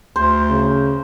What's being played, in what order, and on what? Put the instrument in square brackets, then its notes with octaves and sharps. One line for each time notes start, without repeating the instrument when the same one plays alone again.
[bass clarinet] D2 [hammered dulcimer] C5
[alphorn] C#3